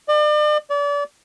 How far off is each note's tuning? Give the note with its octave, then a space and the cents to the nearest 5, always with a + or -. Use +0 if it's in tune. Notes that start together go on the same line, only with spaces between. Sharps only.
D5 +40
D5 -35